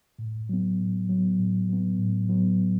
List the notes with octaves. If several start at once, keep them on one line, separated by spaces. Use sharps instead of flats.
A2
F#3 B3
A2
F#3 B3
A2
F#3 B3
A2
F#3 B3